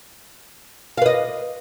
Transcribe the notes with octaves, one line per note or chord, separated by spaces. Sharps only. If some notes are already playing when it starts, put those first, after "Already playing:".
B4 D#5 F5